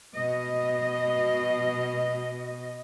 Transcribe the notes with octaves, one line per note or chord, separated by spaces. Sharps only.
B2 D#5